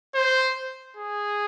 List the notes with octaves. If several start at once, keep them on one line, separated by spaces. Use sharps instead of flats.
C5
G#4